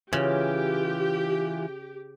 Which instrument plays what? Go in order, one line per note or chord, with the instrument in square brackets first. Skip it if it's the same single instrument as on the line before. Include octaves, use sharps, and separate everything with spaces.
[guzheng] C#3 [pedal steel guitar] E3 F4 [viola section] G4